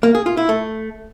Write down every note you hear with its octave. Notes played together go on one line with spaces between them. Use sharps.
A#3
G#4
F4
E4
A3